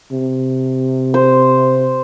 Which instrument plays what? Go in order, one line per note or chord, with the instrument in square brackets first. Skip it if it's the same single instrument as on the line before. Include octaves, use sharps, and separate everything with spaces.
[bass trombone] C3
[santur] C5